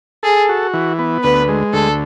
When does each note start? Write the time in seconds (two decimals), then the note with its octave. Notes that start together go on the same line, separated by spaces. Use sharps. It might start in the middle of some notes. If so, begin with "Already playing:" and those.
0.23 G#4 A4
0.49 F#4
0.74 E3
0.99 B3
1.23 D2 B4
1.48 G#3
1.73 D2 A4